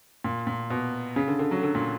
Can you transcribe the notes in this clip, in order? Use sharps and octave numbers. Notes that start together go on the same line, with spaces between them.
A#2
A#2
B2
C#3
D3
D3
F#3
D3
A#2